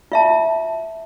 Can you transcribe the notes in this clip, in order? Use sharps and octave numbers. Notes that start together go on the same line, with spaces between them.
F4 E5 A5